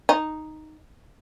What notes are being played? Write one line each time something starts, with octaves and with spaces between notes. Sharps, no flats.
D#4